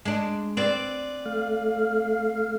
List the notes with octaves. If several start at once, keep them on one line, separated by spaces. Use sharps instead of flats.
G#3 D4
C4 B4 D5
A3 F5